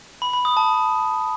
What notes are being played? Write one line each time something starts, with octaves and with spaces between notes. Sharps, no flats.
B5
B5
D#6
A5